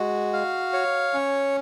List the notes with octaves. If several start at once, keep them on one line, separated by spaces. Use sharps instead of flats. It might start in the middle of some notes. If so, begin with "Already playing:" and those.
Already playing: G#3 F#4
F5
C#5
C#4